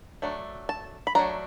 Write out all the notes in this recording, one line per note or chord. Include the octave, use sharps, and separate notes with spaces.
F#3 A3 D4
A5
B5
F#3 A3 D4 A#5